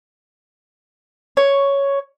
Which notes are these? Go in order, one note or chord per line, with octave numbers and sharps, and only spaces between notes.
C#5